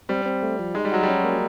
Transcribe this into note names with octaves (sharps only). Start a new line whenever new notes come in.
G3 C4
C4
A3
F3
G#3 D#4
G3
F#3 F#4
G3
C#4
A#3